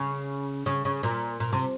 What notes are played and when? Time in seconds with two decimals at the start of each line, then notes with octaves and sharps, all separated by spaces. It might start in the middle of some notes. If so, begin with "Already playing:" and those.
Already playing: C#3
0.66 C#3
0.85 C#3
1.03 A#2
1.40 A#2
1.53 C3